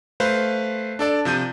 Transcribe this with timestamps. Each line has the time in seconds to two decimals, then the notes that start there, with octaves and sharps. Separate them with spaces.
0.20 A3 B4 C5 F5
0.99 D4 A4 D5
1.25 C3 F3 G6 D#7